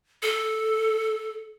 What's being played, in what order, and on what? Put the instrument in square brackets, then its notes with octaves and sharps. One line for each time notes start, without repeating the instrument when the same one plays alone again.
[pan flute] A4